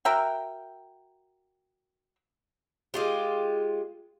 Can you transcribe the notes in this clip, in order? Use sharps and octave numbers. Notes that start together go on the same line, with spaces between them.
F#4 A#4 E5 G5
G#3 F4 G4